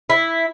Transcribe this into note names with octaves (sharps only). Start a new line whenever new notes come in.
E4